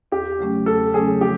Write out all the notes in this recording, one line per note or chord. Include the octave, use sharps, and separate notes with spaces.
E2 G4
C#3 F#3 A3 C#4
E2 A4
C#3 F#3 A3 C#4 G#4
F3 G4